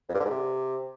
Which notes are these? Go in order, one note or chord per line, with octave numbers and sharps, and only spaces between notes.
F2
G2
D3
G#2
C3